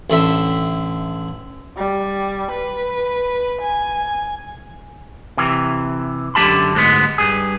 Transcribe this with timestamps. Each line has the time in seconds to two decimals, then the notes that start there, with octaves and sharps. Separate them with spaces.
0.10 A1 D3 E5
1.77 G3
2.51 B4
3.61 G#5
5.37 C3 E3
6.35 F#2 D3 A3 G4 A5 B5
6.75 D2 G#2 G#3 B3
7.18 G2 G#4